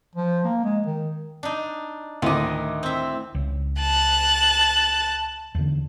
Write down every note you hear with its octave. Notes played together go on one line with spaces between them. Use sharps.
F3
A#3
G#3
D#3
D4 D#4
D2 A2 D#3 D#5 D6
C4 E5
C#2
A5 F#6
E2 D3